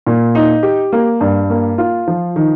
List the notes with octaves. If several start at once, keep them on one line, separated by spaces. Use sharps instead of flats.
A#2
D#4
G4
A#3
G2
A#3
F4
F3
D#3